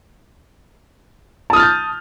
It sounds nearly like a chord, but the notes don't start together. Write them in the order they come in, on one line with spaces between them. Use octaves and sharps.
A5 D#6 F6 A6 G6